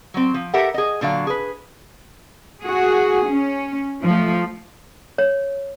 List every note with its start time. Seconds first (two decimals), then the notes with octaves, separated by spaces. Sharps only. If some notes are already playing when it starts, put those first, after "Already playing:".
0.14 F#3 C4
0.34 F3
0.54 G4 A4 A#4 E5 F#5
0.74 G#4 D#5
1.01 A#2 D3 F#3 F5
1.27 G#4 B4
2.61 F#4 G#4
3.27 C#4
4.03 F3 A3
5.18 C#5